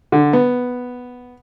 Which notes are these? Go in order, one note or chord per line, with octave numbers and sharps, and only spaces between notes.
D3
B3